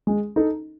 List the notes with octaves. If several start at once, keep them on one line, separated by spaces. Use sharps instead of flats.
G#3
D#4 A4